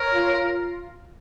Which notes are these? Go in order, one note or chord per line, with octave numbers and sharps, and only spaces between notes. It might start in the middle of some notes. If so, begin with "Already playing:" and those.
Already playing: A#4 C#5
F4
F4